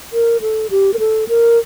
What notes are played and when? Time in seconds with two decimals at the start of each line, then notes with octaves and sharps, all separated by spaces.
0.13 A#4
0.41 A4
0.70 G4
0.94 A#4
0.99 A4
1.28 A#4